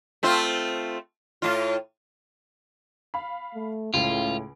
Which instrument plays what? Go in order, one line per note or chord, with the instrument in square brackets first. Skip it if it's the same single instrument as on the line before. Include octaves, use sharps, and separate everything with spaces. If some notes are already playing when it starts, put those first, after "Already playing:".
[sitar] A3 C4 F4
A2 F4
[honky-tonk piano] F5 B5
[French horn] A3
[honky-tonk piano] C#2 D7 [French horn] A2 [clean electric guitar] F4